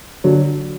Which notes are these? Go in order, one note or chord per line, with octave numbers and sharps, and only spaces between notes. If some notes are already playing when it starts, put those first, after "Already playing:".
D3 F#3